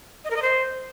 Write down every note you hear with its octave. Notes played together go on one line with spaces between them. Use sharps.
D#5
A#4
D#5
C5